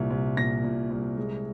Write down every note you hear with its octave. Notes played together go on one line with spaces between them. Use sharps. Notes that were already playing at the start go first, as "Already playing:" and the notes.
Already playing: C2 A#2
C2
A#2 A#6
A#2
C2
G#3